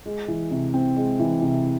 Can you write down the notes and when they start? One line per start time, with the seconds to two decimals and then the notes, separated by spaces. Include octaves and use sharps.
0.06 G#3
0.28 E3
0.51 C3
0.74 C4
0.96 G#3
1.20 E3
1.42 C3